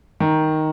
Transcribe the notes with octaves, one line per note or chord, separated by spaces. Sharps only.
D#3 A#5